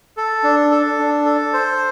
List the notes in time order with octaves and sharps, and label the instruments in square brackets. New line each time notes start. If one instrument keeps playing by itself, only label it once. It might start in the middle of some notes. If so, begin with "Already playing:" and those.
[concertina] A4
D4
A4
D4
A4
C5